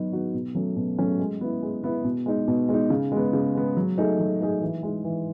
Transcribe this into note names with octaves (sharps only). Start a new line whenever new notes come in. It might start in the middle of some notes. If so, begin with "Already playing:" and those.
Already playing: F#3 B3 D#4 F#4
B3 D#4 F#4
B2
F#3 A3 C#4
B2
F#3 A3 C#4
G#3
B3 E4
G#3
B3 E4
B2
G#3 D#4
B2
G#3 D#4
C#3
G#3 B3
C#3
G#3 B3
F#3
A3 D#4 G#4
F#3
A3 D#4 G#4
E3
G#3 D#4
E3